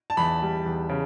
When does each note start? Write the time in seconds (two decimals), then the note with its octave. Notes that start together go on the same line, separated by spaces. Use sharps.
0.10 A5
0.17 E2 B5
0.42 G3
0.66 E2
0.89 C#3